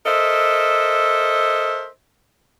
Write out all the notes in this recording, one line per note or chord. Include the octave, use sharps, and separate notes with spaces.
A4 A#4 C5 D#5 E5